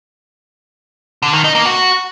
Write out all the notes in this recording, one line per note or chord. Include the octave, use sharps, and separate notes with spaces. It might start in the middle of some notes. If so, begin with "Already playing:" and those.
D3
D#3
D#4
A#3
F#4